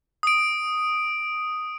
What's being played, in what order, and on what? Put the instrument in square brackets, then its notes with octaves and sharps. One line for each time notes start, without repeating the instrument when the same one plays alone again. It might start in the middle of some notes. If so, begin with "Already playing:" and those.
[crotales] D#6 D7